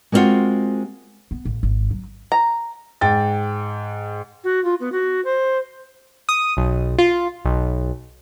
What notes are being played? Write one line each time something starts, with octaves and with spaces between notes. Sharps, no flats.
G#3 A#3 C4 C#4 F4 F#4
B3
A1
G#1
F#3
A#5
G#2 G5 A6
F#4
F4
B3
F#4
C5
D#6
B1
F4
B1